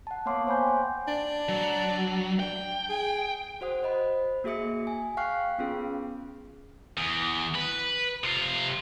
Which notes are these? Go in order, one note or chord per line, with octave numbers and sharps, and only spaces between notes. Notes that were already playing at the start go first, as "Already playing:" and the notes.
F#5 A5
A#3 B3 C#5 F5 C6 D6
C5 C#5 F#5 G#5 B5 G6
G5
D4
F#3
D4 G5
G#4
F#4 C5 F#5 D#6
C5 D#5 B5
A#3 F#4 G#4 E5 D#6 C#7
G#5
F5 G5 C#6 F6 F#6 C7
B3 C#4 F4 G#4
E2
B4
C3 F4